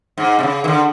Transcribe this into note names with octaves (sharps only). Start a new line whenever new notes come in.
G#2
C3
C#3
D#3
D3